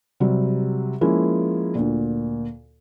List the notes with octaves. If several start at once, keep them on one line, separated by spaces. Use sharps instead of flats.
C3 F#3 G3
F3 G#3 A#3 C#4 E4
D2 A#2